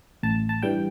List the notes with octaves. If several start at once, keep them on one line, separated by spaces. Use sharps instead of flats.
A1 A5
A5
G2 E3 G3 G5